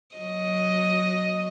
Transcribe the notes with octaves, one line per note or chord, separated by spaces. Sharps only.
F#3 D#5